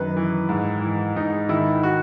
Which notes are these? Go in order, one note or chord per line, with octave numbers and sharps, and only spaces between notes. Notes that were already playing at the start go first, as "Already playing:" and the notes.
Already playing: F#2 D#3 B4
E3
G#2
E3
G#2 D#4
D#3 E4
F#4